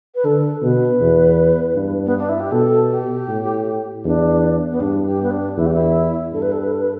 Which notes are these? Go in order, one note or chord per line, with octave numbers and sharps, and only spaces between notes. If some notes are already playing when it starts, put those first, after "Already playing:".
B4
D3 A4
B2 B4
E2
G2
B3
D4
E4
G4
B2 A4
G4
A2
E2 D4
B3
G2 D4
G4
B3
D4
E2 E4
G4
E4
G2 A4
B4
A4
B4
A4
B4